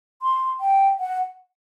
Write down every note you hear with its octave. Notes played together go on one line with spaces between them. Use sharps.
C6
G5
F#5